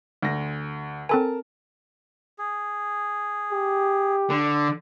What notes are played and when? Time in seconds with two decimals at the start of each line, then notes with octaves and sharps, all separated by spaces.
0.22 D2 A#6
1.09 C4 A4 A#4 G#5 A5
2.38 G#4
3.52 G4
4.30 D3